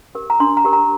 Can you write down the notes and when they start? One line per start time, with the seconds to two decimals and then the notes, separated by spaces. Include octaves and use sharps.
0.15 G4 A#4
0.30 A#5
0.40 D4 C6
0.57 A#5
0.65 G4 A#4
0.73 A#5